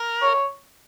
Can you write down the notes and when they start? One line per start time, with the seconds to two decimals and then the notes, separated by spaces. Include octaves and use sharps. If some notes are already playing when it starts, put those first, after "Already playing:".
Already playing: A#4
0.22 C#5